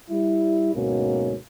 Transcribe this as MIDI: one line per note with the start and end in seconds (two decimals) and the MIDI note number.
0.10 0.71 55
0.10 0.71 64
0.74 1.34 38
0.74 1.34 44
0.74 1.34 47
0.74 1.34 54
0.74 1.34 58
0.74 1.34 61